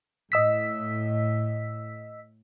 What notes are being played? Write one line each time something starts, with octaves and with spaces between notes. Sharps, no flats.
A2 D#5 E6 B6